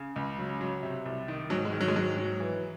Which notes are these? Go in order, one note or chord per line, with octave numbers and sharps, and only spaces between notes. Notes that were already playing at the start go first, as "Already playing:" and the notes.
Already playing: C#3
C#2
F#3
F#3
C3
C2
D#3
G#2 F#3
G#3
D#3
F#3
G#3
G#2 F#3
F#3
E3